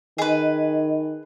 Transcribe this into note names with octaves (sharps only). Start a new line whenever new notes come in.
D#3 G#4 B4 D#5